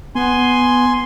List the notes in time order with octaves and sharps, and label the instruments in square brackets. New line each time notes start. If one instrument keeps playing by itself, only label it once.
[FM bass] B3 [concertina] G#5 C6